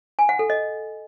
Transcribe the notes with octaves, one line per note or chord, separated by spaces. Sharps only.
G#5
F#5
A4
D#5